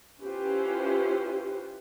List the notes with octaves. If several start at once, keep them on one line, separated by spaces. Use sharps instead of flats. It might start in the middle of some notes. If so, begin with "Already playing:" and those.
C#4 E4 F4 G4 B4 C5